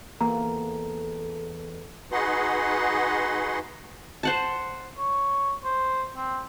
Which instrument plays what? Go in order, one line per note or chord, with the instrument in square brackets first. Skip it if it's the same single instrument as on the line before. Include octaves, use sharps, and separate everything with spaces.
[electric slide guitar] E2 [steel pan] A#3 [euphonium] A4 [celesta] A#5
[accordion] D#4 F#4 G#4 B4 F#5 C6
[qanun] C5 F#5 A5
[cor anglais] C#5
C5
C4